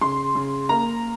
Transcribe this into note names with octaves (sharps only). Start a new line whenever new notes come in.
C#3 C6
C#3
A#3 A#5